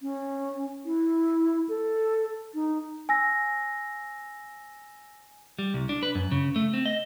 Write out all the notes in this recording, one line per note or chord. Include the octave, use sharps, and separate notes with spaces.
C#4
E4
A4
D#4
G#5 E6 A#6
G3
C2
D4
B4
F#2
C#3
A3
C4
D#5